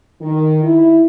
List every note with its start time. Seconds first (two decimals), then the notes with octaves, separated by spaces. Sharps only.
0.21 D#3
0.63 E4